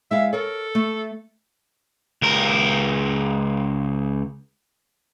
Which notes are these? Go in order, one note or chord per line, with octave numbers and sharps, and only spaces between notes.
G#3 E4 E5 F5
A4 A#4 C#5
A3
C#2 A#4